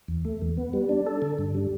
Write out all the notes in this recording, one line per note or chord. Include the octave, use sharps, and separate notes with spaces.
E2
A3
E2
B3
G3
D4
A4
D3
G2
G3